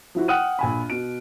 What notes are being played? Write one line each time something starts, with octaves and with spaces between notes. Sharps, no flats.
F3 E4 F#4
F#5 G5 D#6 F6 F#6 D#7
A#1 G#5 B5
B2 D7